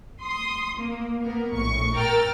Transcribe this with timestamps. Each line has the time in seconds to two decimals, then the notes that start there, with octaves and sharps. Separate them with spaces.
0.21 C6 D#6
0.77 A#3
1.22 A#3 B3 A#4
1.53 A#1 A2 C#6
1.95 A#4 G5 A#5 E6 F6 A6